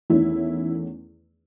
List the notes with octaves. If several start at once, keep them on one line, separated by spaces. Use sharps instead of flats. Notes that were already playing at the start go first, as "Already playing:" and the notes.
E2 D#3 A3 C#4 E4